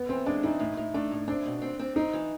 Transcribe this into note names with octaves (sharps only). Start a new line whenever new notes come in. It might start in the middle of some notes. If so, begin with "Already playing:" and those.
Already playing: B3
E3 C4
G#3 D4
E3 D#4
A2
A2
A3 D4
A2
C4 D4
B2
C4
C4
C4 D#4
E3